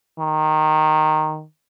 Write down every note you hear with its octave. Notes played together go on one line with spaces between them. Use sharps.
D#3